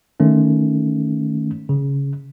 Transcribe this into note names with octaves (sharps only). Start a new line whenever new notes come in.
D#3 A3 C#4
C#3